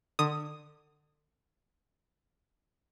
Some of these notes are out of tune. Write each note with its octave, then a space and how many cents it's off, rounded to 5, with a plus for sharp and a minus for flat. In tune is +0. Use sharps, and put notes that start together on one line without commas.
D3 +30 D#6 +0